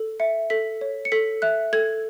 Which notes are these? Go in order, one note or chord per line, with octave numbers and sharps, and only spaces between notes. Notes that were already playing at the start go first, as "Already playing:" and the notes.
Already playing: A4
E5 C#7
A4 B6
C#5
C#7
A4 B6
E5 F#6
A4 G#6